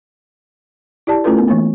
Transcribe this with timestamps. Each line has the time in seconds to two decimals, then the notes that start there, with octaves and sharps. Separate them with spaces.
1.07 E4 G4 D5 A5
1.24 A3 C#4 E4 F4 A4 B4
1.37 B3 A#4
1.48 E3 A3 A#3